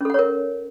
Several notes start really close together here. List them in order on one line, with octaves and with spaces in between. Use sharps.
C#4 A4 F#5 C#5 A#4